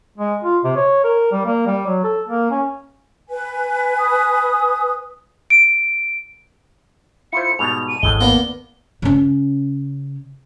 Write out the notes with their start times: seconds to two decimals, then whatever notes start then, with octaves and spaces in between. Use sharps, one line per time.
0.18 G#3
0.44 F4
0.64 C3
0.76 C#5
1.04 A#4
1.32 G3
1.46 A#3
1.67 G3
1.86 F#3
2.04 A4
2.28 A#3
2.51 C#4
3.30 B4 G#5
3.99 D#6
5.50 D7
7.33 E4 F4 C5 C#7
7.59 G#2 B2 G3 F7
7.88 D#7
8.03 G#1 E2 A2 G#3 G7
8.21 A#3 B3 D4 G7
9.02 C#3 C#4